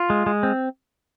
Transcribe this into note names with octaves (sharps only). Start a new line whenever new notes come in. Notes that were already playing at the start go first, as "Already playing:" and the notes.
Already playing: F4
G#3
G#3
C4